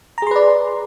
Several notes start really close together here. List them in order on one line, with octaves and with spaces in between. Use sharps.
A#5 G#4 C6 B4 D5